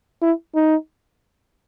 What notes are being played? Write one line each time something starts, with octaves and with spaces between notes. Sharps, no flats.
E4
D#4